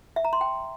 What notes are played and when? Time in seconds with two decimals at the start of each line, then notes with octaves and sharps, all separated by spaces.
0.16 E5
0.25 A#5
0.33 C6
0.41 G5